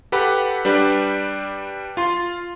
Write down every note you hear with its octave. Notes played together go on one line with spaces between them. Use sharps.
G4 A4 B4 F#5 B5
G3 D4 G4 B4
F4 C6